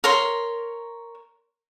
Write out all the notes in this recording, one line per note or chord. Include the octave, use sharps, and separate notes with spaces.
A#4 C#5 C6